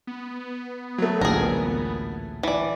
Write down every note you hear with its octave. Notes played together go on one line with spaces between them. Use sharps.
B3
F#3 A3
A1 D2 A#2 G#4 A#4
E3 D5